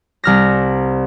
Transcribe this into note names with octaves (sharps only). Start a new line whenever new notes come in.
C2 F6 A#6